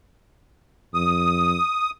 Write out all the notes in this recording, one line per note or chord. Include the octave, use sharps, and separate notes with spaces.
F2 D#6